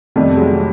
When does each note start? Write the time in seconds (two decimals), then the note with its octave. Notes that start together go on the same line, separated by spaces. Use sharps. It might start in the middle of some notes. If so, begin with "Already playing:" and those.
0.16 F2 C3 D#3 G3 A3
0.37 F#3 G#3